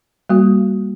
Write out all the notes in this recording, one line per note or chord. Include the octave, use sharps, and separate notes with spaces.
G3 A#3 F#4